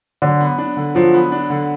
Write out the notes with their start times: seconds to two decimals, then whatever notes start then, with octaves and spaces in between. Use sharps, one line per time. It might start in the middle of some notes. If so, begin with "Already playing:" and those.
0.22 D3 F#3
0.41 B3
0.58 D4
0.77 D3
0.95 F3 F#3
1.14 B3
1.32 D4
1.50 D3